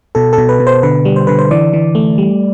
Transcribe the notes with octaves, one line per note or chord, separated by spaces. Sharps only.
B2 A4
A4
B2
B4
B2
C5
D3 B4
G3
C5
D3 B4
C5
E3 D5
E3
A3
G3